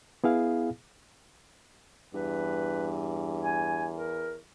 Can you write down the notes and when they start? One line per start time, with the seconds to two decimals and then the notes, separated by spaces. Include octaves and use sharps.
0.24 B3 E4 G#4 F5
2.14 E2 G2 B4
3.41 G#5
3.94 A#4